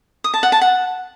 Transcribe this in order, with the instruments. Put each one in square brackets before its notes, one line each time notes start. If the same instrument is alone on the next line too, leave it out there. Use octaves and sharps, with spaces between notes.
[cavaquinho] D#6
A5
F#5
A5
F#5